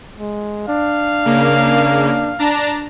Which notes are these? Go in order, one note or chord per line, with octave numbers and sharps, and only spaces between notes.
G#3
D4 F5
C#3 A#3
D4 A5 A#5